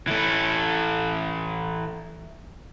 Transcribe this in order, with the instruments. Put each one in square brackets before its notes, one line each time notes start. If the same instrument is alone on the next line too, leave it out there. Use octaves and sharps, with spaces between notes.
[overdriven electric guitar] E3 A3